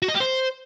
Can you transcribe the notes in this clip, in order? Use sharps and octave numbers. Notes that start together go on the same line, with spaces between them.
F#4
D#5
G4
C5